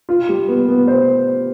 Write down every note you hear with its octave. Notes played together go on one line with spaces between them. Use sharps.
F4
G3
B3
B3
C5